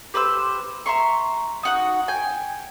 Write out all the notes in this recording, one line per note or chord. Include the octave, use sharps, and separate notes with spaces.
G4 B4 C5 E6
E5 A#5 C6 C#6
D#4 F#4 F#5
G5 G#5